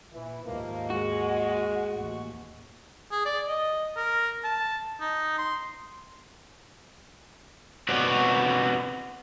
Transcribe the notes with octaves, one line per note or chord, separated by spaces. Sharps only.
A#2 E3
D#2 G#2 D#3 F3 A#3
G#3 F#4
A1 D#2
G#4
D5
D#5
A#4
A5
D#4
C6
C4 F#4 B4 C#5 D5